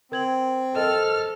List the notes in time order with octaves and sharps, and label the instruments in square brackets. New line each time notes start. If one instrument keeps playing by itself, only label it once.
[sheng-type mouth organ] C4 [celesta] A#4 G#6 F#7
[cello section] A4 [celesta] A#4 C5 D#5 [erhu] F6